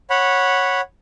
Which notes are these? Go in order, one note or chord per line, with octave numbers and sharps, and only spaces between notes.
C#5 F#5 B5